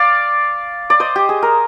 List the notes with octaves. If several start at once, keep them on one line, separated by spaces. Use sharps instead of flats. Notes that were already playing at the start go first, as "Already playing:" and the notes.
Already playing: D5 F5
D5
C5 D#5
G4
G#4
A#4